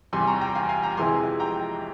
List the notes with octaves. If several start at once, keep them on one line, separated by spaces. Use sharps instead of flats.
E2 C3 G3 G#5 C6
A#5 C#6
G5 A#5
F5 G#5
F5 G#5
G5 A#5
F2 C3 E3 G#3 E4 G#5 C6
G5 A#5